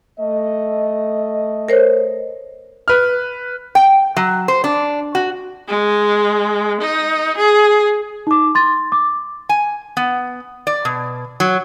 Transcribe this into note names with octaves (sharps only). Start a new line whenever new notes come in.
A3 D#5
A#4 C5 C#5
B4 F6
G5
F#3
C5
D4
F#4
G#3
D#4
G#4
D#4 D6
C6 A6
D6
G#5
B3
D5
B2
F#3